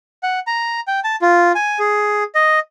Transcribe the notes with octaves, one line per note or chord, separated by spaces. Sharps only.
F#5
A#5
G5
A5
F4
G#5
G#4
D#5